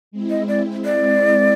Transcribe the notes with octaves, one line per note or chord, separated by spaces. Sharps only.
G#3 C4 E4
D#5
D5
D5